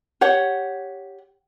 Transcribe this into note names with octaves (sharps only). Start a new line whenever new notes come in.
G4 C#5 F#5